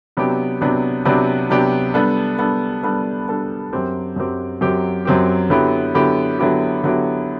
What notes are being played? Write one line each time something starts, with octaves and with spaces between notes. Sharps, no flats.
C3 F#3 B3 D4 G4
C3 F#3 B3 D4 G4
C3 F#3 B3 D4 G4
C3 F#3 B3 D4 G4
G3 B3 D4 A4
G3 B3 D4 A4
G3 B3 D4 A4
G3 B3 D4 A4
F#2 F#3 C4 G4
F#2 F#3 C4 G4
F#2 F#3 C4 G4
F#2 F#3 C4 G4
D3 F#3 B3 E4 G4
D3 F#3 B3 E4 G4
D3 F#3 B3 E4 G4
D3 F#3 B3 E4 G4